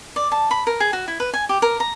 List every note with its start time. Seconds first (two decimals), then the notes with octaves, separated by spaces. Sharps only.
0.16 D5
0.32 A5
0.51 B5
0.67 A#4
0.80 G#4
0.93 F#4
1.08 E4
1.20 B4
1.33 G#5
1.49 G4
1.62 A#4
1.80 A#5